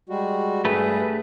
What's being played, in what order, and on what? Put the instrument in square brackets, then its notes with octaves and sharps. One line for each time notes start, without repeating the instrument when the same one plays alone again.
[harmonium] G3 G#3 F#4
[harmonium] G2 G#4 [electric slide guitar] A3 B4